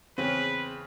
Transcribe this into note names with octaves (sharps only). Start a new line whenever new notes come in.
E2 C#3 C4 C#4 B4